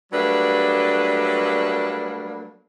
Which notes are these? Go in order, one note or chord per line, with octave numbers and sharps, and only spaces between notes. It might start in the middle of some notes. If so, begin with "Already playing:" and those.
F#3 G3 A3 A#3 D4 B4